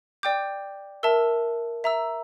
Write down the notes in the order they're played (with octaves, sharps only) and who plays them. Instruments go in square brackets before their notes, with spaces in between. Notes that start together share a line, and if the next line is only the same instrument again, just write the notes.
[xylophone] D5 G5 D6 G6
A#4 E5 A5 E6
E5 A#5 E6